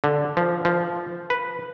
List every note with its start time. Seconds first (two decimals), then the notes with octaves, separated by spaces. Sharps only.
0.04 D3
0.37 F3
0.65 F3
1.30 B4